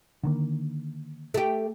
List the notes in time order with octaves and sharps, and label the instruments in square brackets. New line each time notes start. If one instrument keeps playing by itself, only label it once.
[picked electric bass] D3 D#3 A#3
[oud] A3 G4